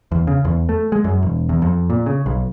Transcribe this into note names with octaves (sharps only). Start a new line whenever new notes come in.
E2
C#3
E2
A3
G#3
F#2
E1
E2
F2
A#2
C#3
B1